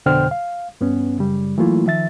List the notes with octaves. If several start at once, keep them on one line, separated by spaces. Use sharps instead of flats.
F2 B2 D3 C5 G5 F6
F5
G2 B3 C#4
F#2 C#3 G3
E3 F#3 A3 A#3 E4 F4
D#3 F3 E5 A6